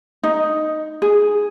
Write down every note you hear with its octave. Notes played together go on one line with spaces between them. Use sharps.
D#4
G#4